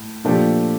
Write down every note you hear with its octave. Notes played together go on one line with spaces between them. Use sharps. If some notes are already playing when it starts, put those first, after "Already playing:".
Already playing: A2
A#2 F3 A3 D4 G4